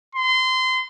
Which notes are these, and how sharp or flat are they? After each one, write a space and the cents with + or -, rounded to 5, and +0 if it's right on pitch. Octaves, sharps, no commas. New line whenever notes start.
C6 -25